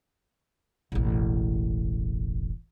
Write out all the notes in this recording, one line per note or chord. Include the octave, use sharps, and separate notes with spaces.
E1 A1